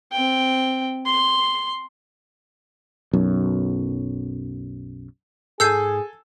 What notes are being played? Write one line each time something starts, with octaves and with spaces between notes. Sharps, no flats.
C4 G5
C6
B1 F#2
G#2 G#4 A4 G#5 E6 G6 C7